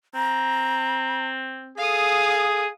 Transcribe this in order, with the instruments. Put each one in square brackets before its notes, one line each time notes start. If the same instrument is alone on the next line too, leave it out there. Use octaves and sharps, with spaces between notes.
[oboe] C4 [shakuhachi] A#5
[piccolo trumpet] G#4 [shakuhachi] A4 [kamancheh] F5 D#6